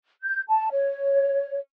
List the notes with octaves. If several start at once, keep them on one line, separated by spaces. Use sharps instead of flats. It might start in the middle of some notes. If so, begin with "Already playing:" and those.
G6
A5
C#5